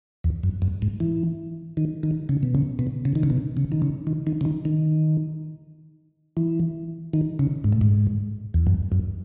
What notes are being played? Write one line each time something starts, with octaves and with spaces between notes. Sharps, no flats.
E2
F#2
F#2
G#2
E3
D#3
D#3
C#3
B2
C#3
B2
C#3
D#3
C#3
B2
C#3
D#3
C#3
D#3
D#3
C#3
D#3
D#3
E3
D#3
C#3
G#2
A2
G#2
E2
F#2
F#2